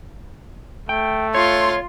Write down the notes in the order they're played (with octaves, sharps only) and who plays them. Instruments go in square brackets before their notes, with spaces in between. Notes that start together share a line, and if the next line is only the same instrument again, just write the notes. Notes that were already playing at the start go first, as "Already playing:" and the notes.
[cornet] A3 [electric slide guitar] G5
[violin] F4 C6 [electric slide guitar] C#5